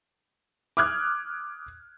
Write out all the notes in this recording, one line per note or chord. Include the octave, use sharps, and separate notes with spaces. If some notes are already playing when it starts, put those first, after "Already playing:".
D6 D#6 F6 F#6 G#6